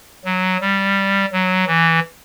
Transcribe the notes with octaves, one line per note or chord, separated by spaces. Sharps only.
F#3
G3
F#3
E3